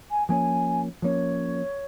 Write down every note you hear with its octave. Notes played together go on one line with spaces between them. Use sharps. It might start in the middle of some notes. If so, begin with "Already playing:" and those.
G#5
F3 A#3 C#4 G#5
F3 A#3 C#4 C#5